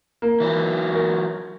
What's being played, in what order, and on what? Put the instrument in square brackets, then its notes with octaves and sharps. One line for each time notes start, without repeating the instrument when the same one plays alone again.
[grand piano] A#3
[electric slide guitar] E3 F#3 B4
[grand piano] A#4 C#6